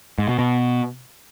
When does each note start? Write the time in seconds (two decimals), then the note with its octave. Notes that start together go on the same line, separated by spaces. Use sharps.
0.18 G#2
0.29 B2
0.39 B2